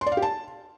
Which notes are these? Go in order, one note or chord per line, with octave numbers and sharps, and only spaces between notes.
C6
D5
F5
G4
A5